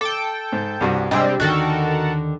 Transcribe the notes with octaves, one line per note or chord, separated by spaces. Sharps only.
A4 G5 D6
G#2
C2 G2 F#4
C3 G3 G#3 C4 D4 D#5 G5 E6
D#2 D3 D#3 F#4 A4 A#4